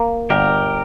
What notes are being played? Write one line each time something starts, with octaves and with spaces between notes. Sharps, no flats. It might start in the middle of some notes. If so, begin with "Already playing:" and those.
Already playing: A#3
G1 G4 A#4